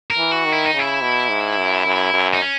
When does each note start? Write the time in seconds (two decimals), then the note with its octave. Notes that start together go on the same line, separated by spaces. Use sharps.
0.10 A#4
0.18 E3
0.31 F#4
0.46 D#3
0.52 E4
0.66 D#4
0.74 C#3
0.79 E4
1.02 B2
1.30 G#2
1.58 F#2
1.86 F#2
2.14 F#2
2.34 D#4
2.42 C#4